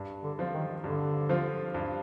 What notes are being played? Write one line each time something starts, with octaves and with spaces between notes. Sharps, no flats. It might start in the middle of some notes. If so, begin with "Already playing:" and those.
Already playing: G2
D3
F3 C4 F4
D#3
G2 D3
F3 C4 F4
G2